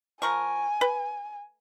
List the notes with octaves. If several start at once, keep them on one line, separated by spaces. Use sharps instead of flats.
F3 A#4 G#5 C#6
B4